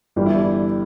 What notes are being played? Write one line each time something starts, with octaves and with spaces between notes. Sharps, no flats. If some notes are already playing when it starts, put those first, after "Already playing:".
G1 G2 E3 G3 G4
E4